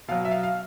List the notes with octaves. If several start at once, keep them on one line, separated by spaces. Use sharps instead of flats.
B2 F#3 F5
E5
F5
F5